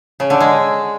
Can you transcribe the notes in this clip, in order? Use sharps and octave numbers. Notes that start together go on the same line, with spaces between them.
C#3
D3
G#3